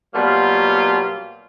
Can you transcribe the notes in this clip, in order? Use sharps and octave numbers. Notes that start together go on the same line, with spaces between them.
B2 F#3 G3 A#3 F4